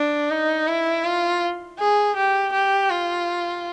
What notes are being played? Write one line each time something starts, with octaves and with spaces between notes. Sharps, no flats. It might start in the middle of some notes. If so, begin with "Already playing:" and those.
Already playing: D4
D#4
E4
F4
G#4
G4
G4
F4